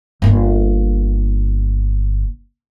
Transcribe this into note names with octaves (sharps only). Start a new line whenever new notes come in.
G1 A#3